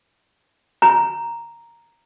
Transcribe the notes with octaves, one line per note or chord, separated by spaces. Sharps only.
A#5